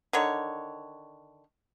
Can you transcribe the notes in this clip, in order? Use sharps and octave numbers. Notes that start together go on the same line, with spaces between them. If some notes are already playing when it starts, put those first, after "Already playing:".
D3 D#3 C#5